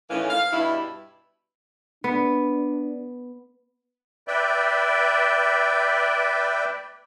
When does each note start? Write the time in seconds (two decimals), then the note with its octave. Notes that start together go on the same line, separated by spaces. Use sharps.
0.10 A2 D#3 E3 C#4 F5
0.30 F5
0.52 G2 B2 E4
2.04 B3 D4
4.28 B4 D5 E5 G5